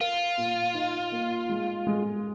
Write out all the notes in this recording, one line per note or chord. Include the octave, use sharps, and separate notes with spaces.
F4 A#4
A#2
D#4
A#3
G#3
G#3